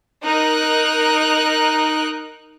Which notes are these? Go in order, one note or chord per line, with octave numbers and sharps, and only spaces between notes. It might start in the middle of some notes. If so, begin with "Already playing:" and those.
D#4 A#4 F#6